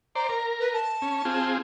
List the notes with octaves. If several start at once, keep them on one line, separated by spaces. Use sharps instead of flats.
C5 D5 A#5
A#4
B4
A5
C#4
C4 F4 G#4